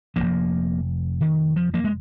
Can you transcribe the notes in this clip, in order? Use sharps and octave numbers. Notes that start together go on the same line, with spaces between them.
F1 D#2 F3 A#3
D#3
F3
F3 A#3
G#3